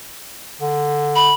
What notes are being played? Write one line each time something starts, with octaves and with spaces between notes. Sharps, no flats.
D3
B5